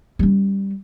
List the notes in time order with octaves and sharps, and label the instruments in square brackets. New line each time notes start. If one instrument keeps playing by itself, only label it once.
[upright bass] G3 C#4